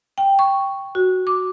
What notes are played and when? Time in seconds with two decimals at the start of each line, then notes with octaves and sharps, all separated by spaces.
0.18 G5
0.39 C#6
0.95 F#4
1.27 D6